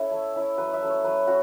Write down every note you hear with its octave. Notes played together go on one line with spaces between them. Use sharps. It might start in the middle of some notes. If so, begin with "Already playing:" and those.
Already playing: C#4 E4 A4 B4 C#5 E5
A3
C#4 E4
F#3 B4
E5
A3 C#4
C#5
F#3 B4
C#4 F#4